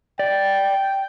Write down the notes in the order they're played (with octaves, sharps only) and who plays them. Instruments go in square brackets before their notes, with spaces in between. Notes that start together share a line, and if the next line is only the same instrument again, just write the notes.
[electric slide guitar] D5 [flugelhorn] G5